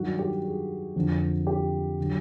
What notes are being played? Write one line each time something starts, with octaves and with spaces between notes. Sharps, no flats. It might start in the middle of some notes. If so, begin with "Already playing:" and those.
Already playing: G2 D#3 F#3 F#4
G4
G#4
F2 D3 F3
G4
D3 F#3